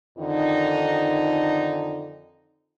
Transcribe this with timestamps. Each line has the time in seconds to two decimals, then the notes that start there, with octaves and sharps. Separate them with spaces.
0.17 F2 D3 D#3 D#4